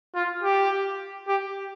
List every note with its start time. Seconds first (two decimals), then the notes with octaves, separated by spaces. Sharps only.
0.15 F4
0.43 G4
1.28 G4